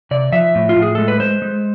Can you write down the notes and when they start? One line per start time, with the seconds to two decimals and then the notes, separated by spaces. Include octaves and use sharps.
0.11 C3 D5
0.32 F3 E5
0.55 A2
0.69 F4
0.76 A2
0.82 G#4
0.95 G#3 A4
1.08 B4
1.19 G#3 C5
1.42 G#3